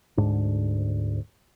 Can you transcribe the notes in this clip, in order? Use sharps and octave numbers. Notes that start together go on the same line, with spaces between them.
D2 G#2 D4